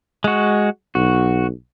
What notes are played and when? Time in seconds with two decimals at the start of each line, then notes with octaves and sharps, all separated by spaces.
0.24 G#3 F#4
0.95 B1 F#4